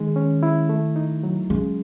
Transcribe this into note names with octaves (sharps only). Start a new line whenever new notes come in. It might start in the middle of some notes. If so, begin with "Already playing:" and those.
Already playing: D#3 G#3
C#4
E4
A3
D#4
F#3
C#3 G#3